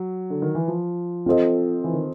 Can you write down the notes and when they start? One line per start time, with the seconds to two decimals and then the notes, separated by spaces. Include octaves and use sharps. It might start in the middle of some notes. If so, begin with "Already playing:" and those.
Already playing: F#3
0.30 D3
0.42 D#3
0.55 E3
0.68 F3
1.26 C4 F4 A4 C5 D#5
1.84 E3
1.93 D#3